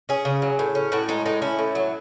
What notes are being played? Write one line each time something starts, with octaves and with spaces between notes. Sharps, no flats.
C#4 G#4
C#3
F#3
A2
C#4
A2 F#4
G#3 D#4
A2 D#4
C#4 E4
A2
F#3